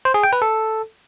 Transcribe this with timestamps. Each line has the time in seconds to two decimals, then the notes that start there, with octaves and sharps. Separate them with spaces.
0.05 C5
0.14 G#4
0.23 G5
0.33 B4
0.42 A4